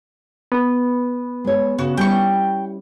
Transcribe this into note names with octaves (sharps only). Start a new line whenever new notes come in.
B3
G#3 C#5
C#3 F#4
G3 C#4 E4 G5 C#6